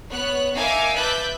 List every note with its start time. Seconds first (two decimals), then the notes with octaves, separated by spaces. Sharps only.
0.11 B3 C#5 F#6
0.55 D#4 A#4 E5 F5 G#5 D6
0.96 B4 E5 A5 D6 F#6 G6